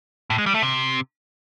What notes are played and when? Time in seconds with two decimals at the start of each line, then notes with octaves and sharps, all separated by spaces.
0.30 A2
0.38 G#3
0.46 G3
0.54 A3
0.62 C3